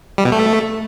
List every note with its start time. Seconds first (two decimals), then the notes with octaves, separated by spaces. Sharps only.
0.18 G3
0.25 B2
0.32 A3